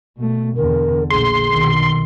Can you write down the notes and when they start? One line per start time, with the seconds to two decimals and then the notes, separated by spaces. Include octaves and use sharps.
0.17 B2 A3
0.56 E2 D3 A#4
1.10 A#1 D3 G#4 C6
1.51 B1 D#3